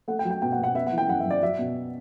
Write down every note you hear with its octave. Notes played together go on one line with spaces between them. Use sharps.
A3 F#5
G5
F#3
G5
B2 G5
F#5
B2
F#5
B3 E5
F#5
E3
G5
F#2 F#5
E5
F#2
D5
F#3 E5
B2